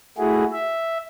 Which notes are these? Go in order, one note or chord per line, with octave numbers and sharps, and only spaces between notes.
A3 E4 F#4 G#4
E5